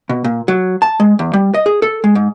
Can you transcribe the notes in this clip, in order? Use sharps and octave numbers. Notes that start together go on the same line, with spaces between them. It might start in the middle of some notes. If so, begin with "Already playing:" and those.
B2
A#2
F#3
A5
G#3
E2
G3
D#5
G#4
A4
G#3
G#2